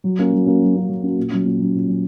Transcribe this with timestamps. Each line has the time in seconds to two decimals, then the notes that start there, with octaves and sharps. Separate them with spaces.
0.04 F#3
0.18 A#3 C#4 F#4
0.33 F#3
0.46 A#3 C#4 F#4
0.61 F#3
0.75 A#3 C#4 F#4
0.89 F#3
1.03 A#3 C#4 F#4
1.18 A#2
1.31 F#3 C#4
1.45 A#2
1.59 F#3 C#4
1.74 A#2
1.88 F#3 C#4